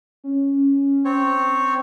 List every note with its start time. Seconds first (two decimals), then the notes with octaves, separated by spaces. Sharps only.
0.24 C#4
1.05 C4 C#5